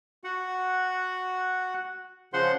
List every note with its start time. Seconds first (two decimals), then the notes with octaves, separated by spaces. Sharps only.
0.24 F#4 F#5
2.33 C#3 F3 C5 F#5 C6